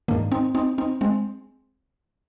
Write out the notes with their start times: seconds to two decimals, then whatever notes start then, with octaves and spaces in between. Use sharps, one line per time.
0.08 G#2 D#3 A#3 D4
0.32 C4 D#4
0.55 C4 D#4
0.78 C4 D#4
1.01 G#3 C4